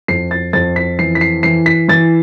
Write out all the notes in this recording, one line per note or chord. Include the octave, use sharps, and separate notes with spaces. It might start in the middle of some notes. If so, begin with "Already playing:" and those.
F2 C7
A6
F2 A6
B6
E3 C7
B6
C7
E3 C7
B6
E3 A6